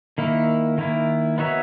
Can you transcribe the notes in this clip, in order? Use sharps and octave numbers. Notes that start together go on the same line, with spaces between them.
D#3 A#3 E4
D#3 A#3 E4
B3 D#4 F#4 C#5 E5